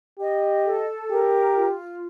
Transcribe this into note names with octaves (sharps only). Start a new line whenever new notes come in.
G4 D#5
A4
G4 A#4
F4